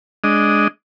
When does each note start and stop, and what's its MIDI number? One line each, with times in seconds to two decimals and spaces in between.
0.24 0.68 56
0.24 0.68 62
0.24 0.68 75